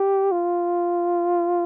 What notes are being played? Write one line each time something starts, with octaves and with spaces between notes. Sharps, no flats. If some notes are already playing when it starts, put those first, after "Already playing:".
Already playing: G4
F4